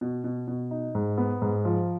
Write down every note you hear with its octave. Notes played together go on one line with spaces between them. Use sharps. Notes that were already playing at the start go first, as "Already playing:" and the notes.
B2
B2
B2
D#4
G#2
B3
G#2
F3